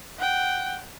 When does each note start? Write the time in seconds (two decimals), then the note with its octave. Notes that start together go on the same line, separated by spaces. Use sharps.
0.19 F#5 G5